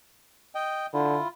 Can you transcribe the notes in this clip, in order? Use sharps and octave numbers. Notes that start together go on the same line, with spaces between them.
D#5 G5
D3 E4 F4